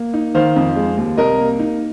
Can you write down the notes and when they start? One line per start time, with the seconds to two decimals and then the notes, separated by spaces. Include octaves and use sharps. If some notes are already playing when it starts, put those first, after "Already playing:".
Already playing: A#3
0.14 D#4
0.35 D#3 C5 F5
0.56 F2
0.76 G#3
0.97 D#2
1.18 C2 A#4 D#5
1.38 A#3
1.59 D#4